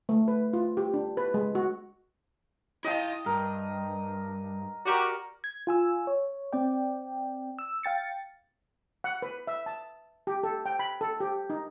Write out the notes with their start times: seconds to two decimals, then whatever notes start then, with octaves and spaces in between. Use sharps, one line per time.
0.09 A3
0.28 B4
0.53 F4
0.77 G4
0.94 D4
1.17 B4
1.34 G#3
1.55 F#4
2.85 E4 D#5 F5 G5 A5
3.26 G2 A#4
4.85 F#4 G4 A#4 D5
5.44 G#6
5.67 F4 G#5 E6
6.07 C#5
6.53 C4 D5 G5
7.59 E6
7.83 F5 G5 A6 C#7
9.04 F#5
9.22 B4
9.47 E5
9.66 A5
10.27 G4
10.43 A4
10.66 G5
10.79 B5
11.01 A4
11.20 G4
11.50 D#4